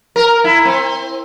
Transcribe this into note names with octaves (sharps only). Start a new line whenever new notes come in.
A#4
E4
C4